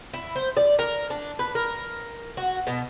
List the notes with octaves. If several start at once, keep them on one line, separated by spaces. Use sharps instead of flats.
E4
C5
D5
A#4
D4
B4
A#4
F#4
B2